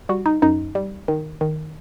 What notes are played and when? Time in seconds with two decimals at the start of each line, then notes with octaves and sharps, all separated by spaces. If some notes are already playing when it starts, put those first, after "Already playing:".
0.09 G3 F#4
0.26 D#4
0.42 F#2 D#4
0.75 G3
1.08 D#3
1.41 D#3